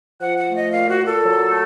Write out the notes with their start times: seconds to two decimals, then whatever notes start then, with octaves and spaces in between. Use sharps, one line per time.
0.21 F3 F#5
0.38 F#5
0.47 A3
0.56 D#5
0.72 A#2 F5
0.90 F#4
0.99 A#2
1.07 A4
1.25 F#3
1.50 A3